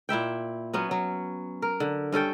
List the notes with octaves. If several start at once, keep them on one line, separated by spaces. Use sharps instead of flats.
A#2 E4 E5 G5
F#3 B3 C#4
F#3
A#4
D3
G2 C#4 A4 G5